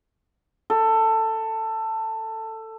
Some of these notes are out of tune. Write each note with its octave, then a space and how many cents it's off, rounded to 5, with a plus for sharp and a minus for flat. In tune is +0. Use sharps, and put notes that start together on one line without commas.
A4 +15